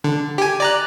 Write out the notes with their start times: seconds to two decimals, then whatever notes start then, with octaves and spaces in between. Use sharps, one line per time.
0.04 D3
0.38 G4 G#5
0.60 D5 A#5 F#6